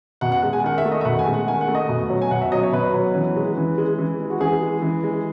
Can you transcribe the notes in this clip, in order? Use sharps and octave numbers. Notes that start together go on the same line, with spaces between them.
B2 F#5
F#5
G#3 F#5
G#5
D#3 F#5
E5
A3
D#5
E5
B2 F#5
G#5
G#3
F#5
D#3 G#5
F#5
A3
D#5
B2
F#3
G#5
B2 F#5
E5
F#3 D#5
C#5
B2 B4
F#3
E3
G#3
E3
G#3
E3
G#3
F#4
E3 G#4
G#3
E3
G#3